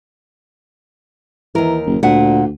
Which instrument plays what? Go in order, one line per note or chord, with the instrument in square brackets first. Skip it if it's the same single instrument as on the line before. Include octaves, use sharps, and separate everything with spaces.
[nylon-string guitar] D#2 A#4 [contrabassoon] E3
[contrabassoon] F#1
[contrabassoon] D2 [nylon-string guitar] A#2 F#5